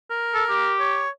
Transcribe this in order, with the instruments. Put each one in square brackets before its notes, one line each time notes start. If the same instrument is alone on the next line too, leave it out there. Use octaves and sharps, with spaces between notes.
[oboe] A#4
[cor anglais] A4
G4
[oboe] C#5